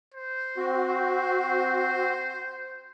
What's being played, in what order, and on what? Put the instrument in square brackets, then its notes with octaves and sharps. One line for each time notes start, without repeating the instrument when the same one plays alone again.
[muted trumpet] C5
[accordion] C4 F#4